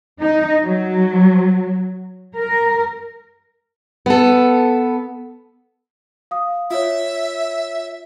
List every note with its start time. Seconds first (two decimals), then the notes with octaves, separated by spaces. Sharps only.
0.21 D#4
0.65 F#3
2.35 A#4
4.06 B3 A4
6.31 F5 D#6
6.71 F4 C#5 E5